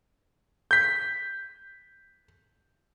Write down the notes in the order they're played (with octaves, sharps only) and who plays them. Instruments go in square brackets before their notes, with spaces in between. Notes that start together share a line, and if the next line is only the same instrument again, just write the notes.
[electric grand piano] G6 B6